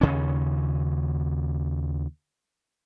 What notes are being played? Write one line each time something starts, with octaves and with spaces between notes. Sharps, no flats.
D#2 C#3 C#4